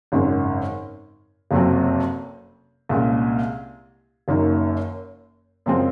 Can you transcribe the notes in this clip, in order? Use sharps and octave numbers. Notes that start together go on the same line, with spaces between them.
G#1 F#2 C#3 G#3
F#1 F2 C3 F#3 C4
C2 A#2 G#3 C#4
F#1 F#2 D#3 A#3
F#2 C#3 F3 G#3 C4